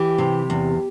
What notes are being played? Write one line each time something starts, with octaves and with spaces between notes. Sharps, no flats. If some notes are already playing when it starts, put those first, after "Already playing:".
Already playing: E3 G4
C3
E2